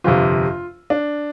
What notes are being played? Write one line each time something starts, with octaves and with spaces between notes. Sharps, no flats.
G1 F2 C3 F4
D4